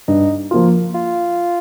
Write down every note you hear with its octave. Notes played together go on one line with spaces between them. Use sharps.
G2 D#4
F3 A#3 F4
F4